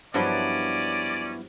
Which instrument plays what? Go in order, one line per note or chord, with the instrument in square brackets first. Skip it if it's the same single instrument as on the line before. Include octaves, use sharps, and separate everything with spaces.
[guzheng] G2 F3 F#3 [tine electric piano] B3 E4 [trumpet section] C#4 D5